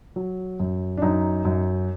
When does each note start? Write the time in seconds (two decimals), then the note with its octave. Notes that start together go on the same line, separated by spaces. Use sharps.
0.16 F#3
0.60 F#2
0.97 D4
1.02 F#2 D#4
1.45 F#2